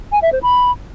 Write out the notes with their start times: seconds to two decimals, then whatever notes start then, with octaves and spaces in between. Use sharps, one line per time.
0.12 G#5
0.22 E5
0.32 C5
0.43 B5